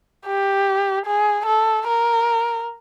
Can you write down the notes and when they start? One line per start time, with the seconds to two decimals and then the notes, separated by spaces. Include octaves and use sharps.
0.26 G4
1.06 G#4
1.46 A4
1.87 A#4